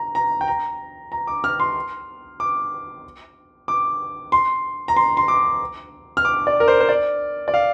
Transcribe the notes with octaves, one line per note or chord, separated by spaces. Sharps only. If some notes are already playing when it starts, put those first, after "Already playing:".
Already playing: A#5
A#5
G5
A#5
A#5
D6
F6
C6
D6
D6
C6
A#5
C6
C6
D6
F6
D6
D5
A#4
C5
C5
D5
D5
F5